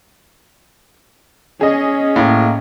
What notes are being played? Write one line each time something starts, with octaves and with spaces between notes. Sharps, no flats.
C#4 G#4 D#5
A2 A#3